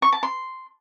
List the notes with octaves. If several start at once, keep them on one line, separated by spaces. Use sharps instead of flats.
C#6
A5
C6